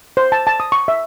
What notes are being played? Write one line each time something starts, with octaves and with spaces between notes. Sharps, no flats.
C5
A5
A5
D#6
C#6
E5